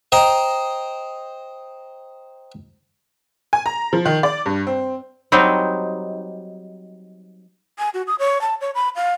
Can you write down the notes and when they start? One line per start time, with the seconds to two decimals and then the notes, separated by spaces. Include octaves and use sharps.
0.12 C5 D#5 G5 A#5
3.53 G#5
3.66 A#5
3.93 F3
4.05 D#3
4.23 D5
4.46 G2
4.67 C4
5.32 F#3 G3 C4 D#4
7.79 G#5
7.94 F#4
8.07 D#6
8.19 C#5
8.41 A5
8.61 C#5
8.75 B5
8.96 F5